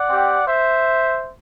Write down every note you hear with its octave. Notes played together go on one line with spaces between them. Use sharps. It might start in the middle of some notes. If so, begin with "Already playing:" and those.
Already playing: D5 F#5
C4 G4
C5 E5